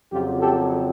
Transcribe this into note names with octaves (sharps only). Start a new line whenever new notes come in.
F2 C#3 F#3 F4 G4
G4 A4